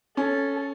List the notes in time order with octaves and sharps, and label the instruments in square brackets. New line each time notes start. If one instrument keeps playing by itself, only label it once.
[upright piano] C#4 [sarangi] A4